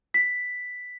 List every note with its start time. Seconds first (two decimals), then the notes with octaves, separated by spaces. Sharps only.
0.14 B6